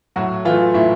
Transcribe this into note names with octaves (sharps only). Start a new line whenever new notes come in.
A2 F#3 F#4
E3 A3 F4
A2 E4